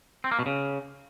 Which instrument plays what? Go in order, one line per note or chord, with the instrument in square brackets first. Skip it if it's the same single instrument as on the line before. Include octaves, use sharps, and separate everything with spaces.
[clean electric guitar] C4
A#3
B2
C#3